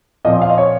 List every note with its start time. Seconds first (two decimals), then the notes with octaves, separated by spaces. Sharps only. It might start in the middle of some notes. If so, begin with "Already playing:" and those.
0.25 A#2 F3 C4 D#5
0.42 F5
0.50 D#5
0.58 C#5